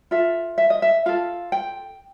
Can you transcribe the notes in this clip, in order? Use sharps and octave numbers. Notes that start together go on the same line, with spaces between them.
F4 A4 E5
E5
D#5
E5
F4 A4 F5
G5